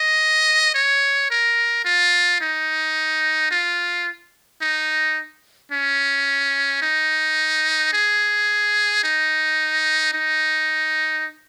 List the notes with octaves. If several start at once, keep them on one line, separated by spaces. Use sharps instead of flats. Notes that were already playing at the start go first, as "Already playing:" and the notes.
Already playing: D#5
C#5
A#4
F4
D#4
F4
D#4
C#4
D#4
G#4
D#4
D#4